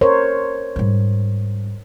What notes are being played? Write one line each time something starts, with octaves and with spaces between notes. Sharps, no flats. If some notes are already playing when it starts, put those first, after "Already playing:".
A#4 C5 C#5
G#2 G3